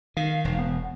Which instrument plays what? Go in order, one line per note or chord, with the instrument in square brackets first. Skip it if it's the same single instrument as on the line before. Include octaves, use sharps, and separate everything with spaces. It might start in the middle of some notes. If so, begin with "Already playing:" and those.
[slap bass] D#3 [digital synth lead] F5
[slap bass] E1
[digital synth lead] B3